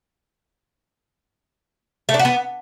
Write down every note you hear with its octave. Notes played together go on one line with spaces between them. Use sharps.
A3
D4
F#4
B3